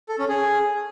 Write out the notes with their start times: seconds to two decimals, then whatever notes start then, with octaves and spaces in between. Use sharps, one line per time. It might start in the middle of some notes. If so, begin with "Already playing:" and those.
0.09 A4
0.19 C#4
0.29 G#4